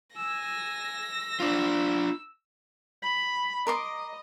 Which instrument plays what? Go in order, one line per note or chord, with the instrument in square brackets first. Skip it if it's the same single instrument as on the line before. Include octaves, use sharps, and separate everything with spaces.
[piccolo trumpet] G#5 [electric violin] E6 [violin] A#6
[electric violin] E6
[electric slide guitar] D4 F4 [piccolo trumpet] C5
[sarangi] B5
[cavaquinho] A#4 C6 D6 [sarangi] D#5